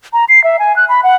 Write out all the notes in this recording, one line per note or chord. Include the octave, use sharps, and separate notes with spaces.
A#5
C7
E5
G#5
F#6
B5
F#5